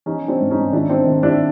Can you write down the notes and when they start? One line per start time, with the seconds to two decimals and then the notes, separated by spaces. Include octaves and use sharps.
0.06 E3 C#4 D#4
0.28 C4 D4
0.40 G#2
0.51 C#4 D#4
0.73 D#3 D4 E4
0.90 C4 D4
1.06 D#3
1.23 D4 E4